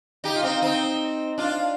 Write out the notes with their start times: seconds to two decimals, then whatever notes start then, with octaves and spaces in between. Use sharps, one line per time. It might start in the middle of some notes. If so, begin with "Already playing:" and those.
0.24 D#4 G4
0.36 F4
0.43 C4 D#4
0.62 C4 D#4
1.38 D4 F4